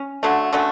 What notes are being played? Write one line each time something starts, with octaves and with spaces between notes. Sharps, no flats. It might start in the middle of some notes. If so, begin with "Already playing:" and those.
Already playing: C#4
D3 F#3 A3
D3 F#3 A3 C#4